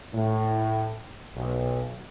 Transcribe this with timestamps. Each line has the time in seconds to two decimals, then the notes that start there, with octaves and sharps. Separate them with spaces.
0.14 A2
1.36 B1